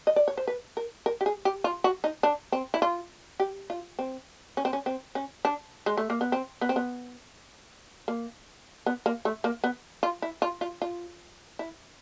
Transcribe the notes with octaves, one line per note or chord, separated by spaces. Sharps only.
D#5
D5
C#5
C5
B4
A#4
A#4
G4
G#4
G4
F4
F#4
D#4
D4
C4
E4
F4
G4
F4
C4
C#4
C4
C#4
C4
C#4
D4
G#3
A3
A#3
B3
C4
B3
C4
B3
A#3
B3
A#3
A3
A#3
B3
F4
E4
F4
F4
F4
E4